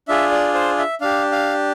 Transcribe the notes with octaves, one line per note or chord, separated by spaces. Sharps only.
D4 F4 G#4 E5
D5
C5
E5
D4 G4 F5
F5